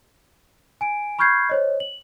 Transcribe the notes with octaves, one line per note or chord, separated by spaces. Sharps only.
G#5 D7
B5 C#6 F6 G6 G#6 C7
C5 C#5 D#5
F#7